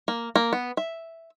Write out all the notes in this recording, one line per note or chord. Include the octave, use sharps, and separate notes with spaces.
A#3
A#3
B3
E5